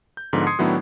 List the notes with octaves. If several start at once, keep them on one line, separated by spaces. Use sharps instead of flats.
G6
G#2 D3 F3 B3
C6 D#6 G#6 C7 C#7
A2 D#3 F#3 B3 D4 E4